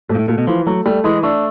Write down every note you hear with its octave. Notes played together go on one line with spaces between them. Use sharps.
G#2 A3
A#2
A2
A#2 A3
B2
E3 F3
F#3 A3
G3 A3
E3 G#3
A3 D4